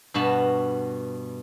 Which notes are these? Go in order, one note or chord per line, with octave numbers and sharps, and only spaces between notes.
G2 B2 F#4 A5 B5